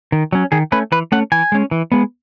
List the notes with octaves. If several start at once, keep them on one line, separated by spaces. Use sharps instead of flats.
D#3
F#3 C#4
D#3 G#4
A3 C#4 B4
E3 B4
A3 C#4 F#5
E3 G#5
G#3 C#4
E3
G#3 B3